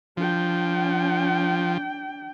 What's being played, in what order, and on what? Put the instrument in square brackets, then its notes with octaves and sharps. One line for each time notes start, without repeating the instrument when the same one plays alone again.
[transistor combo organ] F3 [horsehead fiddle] D4 G5